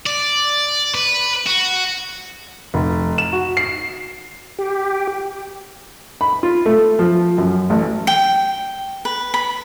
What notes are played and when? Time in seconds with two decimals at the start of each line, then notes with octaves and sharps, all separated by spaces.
0.06 D5
0.94 B4
1.47 F#4
2.74 F1
3.18 E7
3.33 F#4
3.57 C7
4.59 G4
6.21 B5
6.43 F4
6.66 A3
6.99 F3
7.38 F#2
7.70 A1
8.07 G5
9.05 B4
9.34 B5